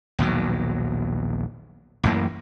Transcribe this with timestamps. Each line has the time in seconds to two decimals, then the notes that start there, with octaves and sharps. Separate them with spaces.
0.19 A#1 D#2 B2 F#3
2.03 A1 F#2 E3 A#3